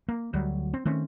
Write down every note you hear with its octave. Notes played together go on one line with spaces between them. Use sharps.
A#3
D2 F#3 G3
C4
D#3 A3 C4 C#4